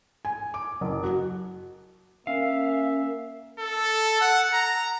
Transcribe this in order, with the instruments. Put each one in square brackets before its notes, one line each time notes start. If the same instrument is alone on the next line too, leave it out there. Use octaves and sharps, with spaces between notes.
[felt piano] G#5
D6
F#1
F#4
[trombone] A#3 [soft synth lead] C#4 [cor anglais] E5 [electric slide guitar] F5
[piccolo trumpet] A4
F#5
A#5